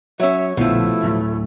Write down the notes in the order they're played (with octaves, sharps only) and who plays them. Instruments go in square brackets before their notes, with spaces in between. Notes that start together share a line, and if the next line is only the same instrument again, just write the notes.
[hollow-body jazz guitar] F#3 C#4 [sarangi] C#5 [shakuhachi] E5
[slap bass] A#1 D3 [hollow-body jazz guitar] B2 F3 [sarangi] A3 [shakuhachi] E4
[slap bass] D2 A2 F#3